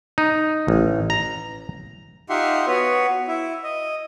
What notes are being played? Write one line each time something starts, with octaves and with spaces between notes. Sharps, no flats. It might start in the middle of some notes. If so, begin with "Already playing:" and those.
D#4
A1
A#5
D#4 F4 G4 E5 F#5 C6
B3 F#4 B4 C#5
E4
D#5